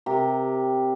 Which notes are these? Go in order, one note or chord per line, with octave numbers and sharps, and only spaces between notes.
C3 G4 A#4